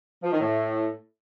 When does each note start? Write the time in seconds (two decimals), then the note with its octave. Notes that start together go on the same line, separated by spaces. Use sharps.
0.23 F3
0.31 D#3
0.40 A2